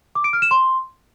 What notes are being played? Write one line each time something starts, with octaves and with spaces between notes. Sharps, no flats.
D6
D7
F6
E7
C6